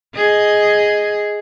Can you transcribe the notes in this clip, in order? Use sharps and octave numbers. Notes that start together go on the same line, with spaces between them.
G#4 D#5